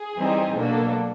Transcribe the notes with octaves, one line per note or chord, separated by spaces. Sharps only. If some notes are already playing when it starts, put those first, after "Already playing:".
Already playing: G#4
E3 G3 C4 D#4
B2 F#3 A#3 D4 A4